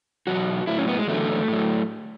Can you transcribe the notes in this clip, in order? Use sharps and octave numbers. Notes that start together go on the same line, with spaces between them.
E2 B2 F#3 F#4
A2 F#3 E4
C#4
B3
G#3
E2 D3 F#3 A3
A2 F#3